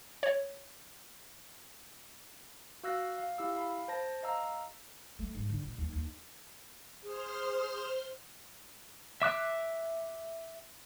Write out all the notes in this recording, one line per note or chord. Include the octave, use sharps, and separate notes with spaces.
C#5
F#4 F5 E6 F#6 A#6
F5
E4 G4 F5 E6
F5 B5
C5 A5 A#6
D#5 F5 A#5 E6
A3
G#2
D3
A#2
D#2
D#2
G#4 C5 C6 F6
E5 D6 F#6